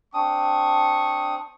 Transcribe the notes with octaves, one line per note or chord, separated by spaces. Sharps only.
C4 D4 C#6 D#6